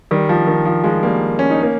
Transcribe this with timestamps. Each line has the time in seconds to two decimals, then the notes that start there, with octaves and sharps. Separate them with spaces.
0.11 D#3 G3
0.29 F3
0.47 D#3
0.65 F3
0.84 F3 G#3
1.03 G3 A#3
1.39 C#4
1.50 D#4
1.63 A#3 C#4